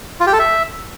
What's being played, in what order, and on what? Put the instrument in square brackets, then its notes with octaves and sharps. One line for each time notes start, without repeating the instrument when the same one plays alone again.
[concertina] F4
G4
A4
E5